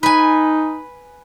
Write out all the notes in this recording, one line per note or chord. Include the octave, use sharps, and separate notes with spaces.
D#4 B4 G#5